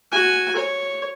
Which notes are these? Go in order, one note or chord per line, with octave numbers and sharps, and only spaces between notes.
F#4 G#5
C#5